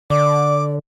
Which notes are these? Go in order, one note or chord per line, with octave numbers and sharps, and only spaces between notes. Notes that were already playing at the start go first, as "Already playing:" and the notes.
D3 D5 D6